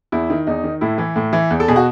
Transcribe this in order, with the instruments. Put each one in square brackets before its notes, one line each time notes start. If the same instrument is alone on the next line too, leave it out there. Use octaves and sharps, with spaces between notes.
[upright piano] E2 E4
D#3
E2 D#4
D#3
A2 E4
E3
A2
E3
E2
A4
B2 G#4
F#4